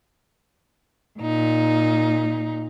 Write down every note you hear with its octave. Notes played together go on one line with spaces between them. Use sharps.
A#2 D#4